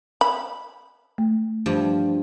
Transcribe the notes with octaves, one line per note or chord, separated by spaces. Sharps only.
B5
A3
G2 F3